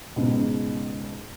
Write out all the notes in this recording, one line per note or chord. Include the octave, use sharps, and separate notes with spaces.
C#2 G#2 B2